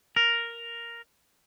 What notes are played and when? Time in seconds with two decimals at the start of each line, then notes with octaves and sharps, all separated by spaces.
0.16 A#4